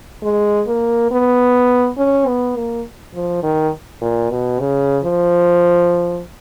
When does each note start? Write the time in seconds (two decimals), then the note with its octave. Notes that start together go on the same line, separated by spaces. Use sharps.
0.23 G#3
0.67 A#3
1.11 B3
1.98 C#4
2.27 B3
2.56 A#3
3.14 F3
3.43 D#3
4.01 A#2
4.30 B2
4.59 C#3
5.04 F3